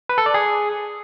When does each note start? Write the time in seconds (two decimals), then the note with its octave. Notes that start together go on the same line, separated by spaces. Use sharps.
0.09 B4
0.18 A4
0.26 D5
0.34 G#4